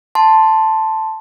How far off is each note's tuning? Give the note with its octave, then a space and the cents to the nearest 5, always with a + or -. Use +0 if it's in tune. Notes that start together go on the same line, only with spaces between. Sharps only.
A5 +0 C6 +0